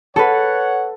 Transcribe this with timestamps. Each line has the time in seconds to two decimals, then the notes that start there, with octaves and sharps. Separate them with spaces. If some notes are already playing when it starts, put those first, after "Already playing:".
0.16 A4 B4 C#5 F#5